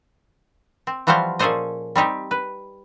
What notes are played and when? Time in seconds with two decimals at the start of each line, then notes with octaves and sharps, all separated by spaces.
0.87 C4
1.07 E3 F3 G3 F#4 C5 F5
1.39 A#2 C#4 G#4 A4 C5 D#5
1.95 G3 C4 D#4 G4
2.31 B4